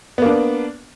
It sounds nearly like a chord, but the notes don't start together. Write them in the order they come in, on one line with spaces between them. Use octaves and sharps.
B3 A#3 D4